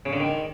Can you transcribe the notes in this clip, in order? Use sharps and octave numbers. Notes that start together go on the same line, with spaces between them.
C#3
D3
D#3